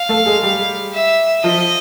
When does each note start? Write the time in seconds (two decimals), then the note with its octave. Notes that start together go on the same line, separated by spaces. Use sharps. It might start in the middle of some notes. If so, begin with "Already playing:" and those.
Already playing: F5
0.09 A3 A4
0.26 G#3 G#4
0.43 G3 G4
0.93 E5
1.44 F3 F4 D#5